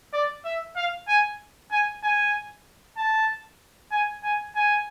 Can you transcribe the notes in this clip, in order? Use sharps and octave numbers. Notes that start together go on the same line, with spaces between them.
D5
E5
F5
G#5
G#5
G#5
A5
G#5
G#5
G#5